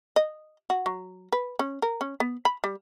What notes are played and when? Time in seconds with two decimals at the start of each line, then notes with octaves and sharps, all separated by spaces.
0.16 D#5
0.70 F#4
0.86 F#3
1.32 B4
1.59 C#4
1.82 A#4
2.01 C#4
2.20 B3
2.45 B5
2.64 G3